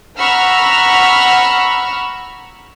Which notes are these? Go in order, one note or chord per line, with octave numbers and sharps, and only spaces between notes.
F#5 A#5 B5 C#6 E6 F6